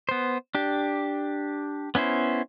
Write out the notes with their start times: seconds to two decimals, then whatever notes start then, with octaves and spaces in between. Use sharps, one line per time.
0.09 B3 C5
0.55 D4 G4
1.95 B3 C#4 E4 C5